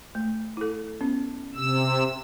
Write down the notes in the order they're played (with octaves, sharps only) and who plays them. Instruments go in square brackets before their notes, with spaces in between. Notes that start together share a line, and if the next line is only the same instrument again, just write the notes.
[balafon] A3
E4 A4
B3 C#4
[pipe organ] C3 E6